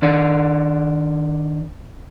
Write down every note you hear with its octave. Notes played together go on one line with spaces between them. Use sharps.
D#3 D4 D5